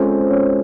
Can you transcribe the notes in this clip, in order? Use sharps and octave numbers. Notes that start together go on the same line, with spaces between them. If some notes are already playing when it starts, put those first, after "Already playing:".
Already playing: G#3 C4 C#4 F4 A4 C5
C#4